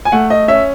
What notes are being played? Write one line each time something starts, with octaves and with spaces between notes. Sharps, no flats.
G#5
A3 F#5
D#5
C#4 E5